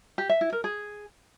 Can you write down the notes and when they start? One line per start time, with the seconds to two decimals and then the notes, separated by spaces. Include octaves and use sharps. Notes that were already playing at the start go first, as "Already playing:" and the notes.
0.18 G4
0.29 E5
0.41 E4
0.52 A#4
0.64 G#4